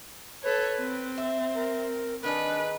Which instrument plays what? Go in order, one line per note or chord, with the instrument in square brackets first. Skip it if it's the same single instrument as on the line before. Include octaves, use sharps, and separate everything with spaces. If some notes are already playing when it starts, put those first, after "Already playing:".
[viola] A4 C#5 [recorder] B4
[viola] C4
[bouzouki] E5
[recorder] A#4
[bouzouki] D#3 D#4 G#4 [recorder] D4 [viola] B4